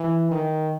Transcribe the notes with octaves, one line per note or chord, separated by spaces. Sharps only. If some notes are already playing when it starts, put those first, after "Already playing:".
Already playing: E3
D#3